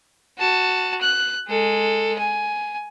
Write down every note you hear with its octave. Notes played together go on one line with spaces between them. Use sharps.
F#4 A5
F#6
G#3 A4
G#5